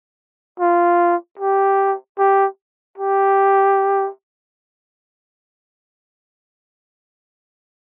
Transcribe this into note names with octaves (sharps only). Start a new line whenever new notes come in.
F4
G4
G4
G4